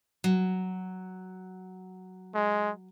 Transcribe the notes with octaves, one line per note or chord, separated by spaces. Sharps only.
F#3
G#3